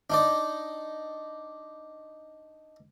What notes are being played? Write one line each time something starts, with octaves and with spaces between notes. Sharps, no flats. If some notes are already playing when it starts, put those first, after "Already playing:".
D4 D#4 D5